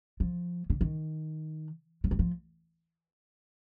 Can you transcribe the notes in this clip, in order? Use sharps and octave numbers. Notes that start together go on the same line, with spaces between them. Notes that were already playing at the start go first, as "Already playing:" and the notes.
F3
D3
D#3
F3
G3
F3